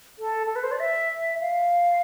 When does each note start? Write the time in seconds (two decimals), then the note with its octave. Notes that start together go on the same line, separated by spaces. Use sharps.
0.19 A4
0.47 A4
0.56 B4
0.63 C5
0.72 D5
0.80 E5
1.41 F5